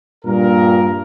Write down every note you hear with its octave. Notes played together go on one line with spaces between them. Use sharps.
G2 A#2 A#4